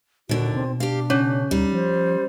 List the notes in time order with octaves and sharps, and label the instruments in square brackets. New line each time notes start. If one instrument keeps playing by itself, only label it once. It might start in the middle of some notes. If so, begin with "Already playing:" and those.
[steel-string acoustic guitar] D#2 D3 [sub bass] A#2 [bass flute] F#4
[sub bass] B2 [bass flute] C4
[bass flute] D4 [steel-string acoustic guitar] G4 F5
[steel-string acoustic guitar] C#3 [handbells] C#4 C#5 G6
[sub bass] D2 [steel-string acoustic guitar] G3 [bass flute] D#4
[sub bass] F3 [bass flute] C5